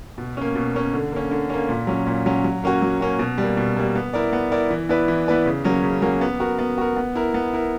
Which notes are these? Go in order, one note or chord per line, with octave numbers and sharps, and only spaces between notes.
B2
A#3 C#4
B2
A#3 C#4
D3
A#3 C#4
D3
A#3 C#4
A#2
F#3 C#4
A#2
F#3 C#4
F#3
A#3 C#4 F#4
F#3
A#3 C#4 F#4
B2
G3 A#3
B2
G3 A#3
B3
E4 A#4 D5
B3
E4 A#4 D5
E3
B3 E4 B4 D5
E3
B3 E4 B4 D5
C#3
F#3 A#3 C#4
C#3
F#3 A#3 C#4
B3
F#4 A#4
B3
F#4 A#4
B3
E4 A#4
B3
E4 A#4